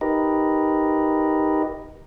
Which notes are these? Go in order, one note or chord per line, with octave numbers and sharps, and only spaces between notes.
D#4 G4 A#4 B4 D#5